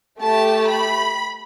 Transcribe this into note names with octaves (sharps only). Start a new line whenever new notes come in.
A3 G4 A5
B5